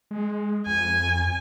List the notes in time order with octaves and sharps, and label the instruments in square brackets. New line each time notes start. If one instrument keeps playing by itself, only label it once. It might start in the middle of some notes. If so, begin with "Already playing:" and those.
[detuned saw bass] G#3
[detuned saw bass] F2 [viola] G#5